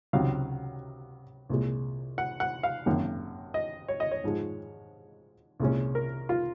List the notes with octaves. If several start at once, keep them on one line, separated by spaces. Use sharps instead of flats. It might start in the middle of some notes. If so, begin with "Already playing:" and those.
C#2 C3 D#3 F#3 F5
C2 A#2 G#3
F#5
F#5
F5
G#1 F#2 D#3 A#3
D#5
C#5
D#5
C#5
G#2 F3 G#3
C2 A#2 G#3 C#4
A#4
F4